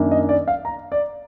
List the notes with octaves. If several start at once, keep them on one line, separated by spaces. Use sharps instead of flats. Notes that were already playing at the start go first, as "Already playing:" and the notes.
Already playing: F#2 D#3 A#3 D4
D#5
D5
F5
A#5
D5